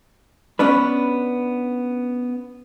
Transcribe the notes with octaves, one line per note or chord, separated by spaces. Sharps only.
B3 C#4 D4 B4